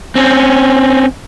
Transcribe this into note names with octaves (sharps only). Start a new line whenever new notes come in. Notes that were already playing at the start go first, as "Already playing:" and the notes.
C4 C#4